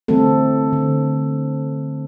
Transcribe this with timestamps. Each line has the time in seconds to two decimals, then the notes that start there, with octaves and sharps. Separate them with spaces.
0.08 D3 E3 G3 A3 C4 A4
0.73 D3